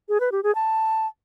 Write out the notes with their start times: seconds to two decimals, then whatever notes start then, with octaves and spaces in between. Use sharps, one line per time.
0.09 G#4
0.20 B4
0.32 G4
0.43 G#4
0.55 A5